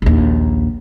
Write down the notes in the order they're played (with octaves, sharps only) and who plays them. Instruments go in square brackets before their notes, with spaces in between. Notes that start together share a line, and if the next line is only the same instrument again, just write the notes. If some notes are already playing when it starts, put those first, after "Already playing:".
[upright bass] A#1 D#2